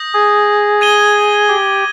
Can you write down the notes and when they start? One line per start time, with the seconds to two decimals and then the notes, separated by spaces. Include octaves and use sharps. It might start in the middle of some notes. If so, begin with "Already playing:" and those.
Already playing: D#6 G6 A#6
0.14 G#4
0.81 G#6 D#7 G7
1.49 G4